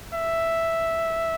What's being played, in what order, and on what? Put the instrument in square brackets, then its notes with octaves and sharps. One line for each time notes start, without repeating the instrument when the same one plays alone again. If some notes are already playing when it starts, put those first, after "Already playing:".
[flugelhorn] E5